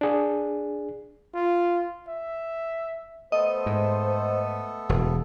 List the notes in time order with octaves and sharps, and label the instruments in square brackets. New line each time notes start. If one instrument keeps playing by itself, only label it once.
[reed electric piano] D4 G#4
[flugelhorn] F4
E5
[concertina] A3 B3 A4 [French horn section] C5 [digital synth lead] D#5
[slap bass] G#2
E1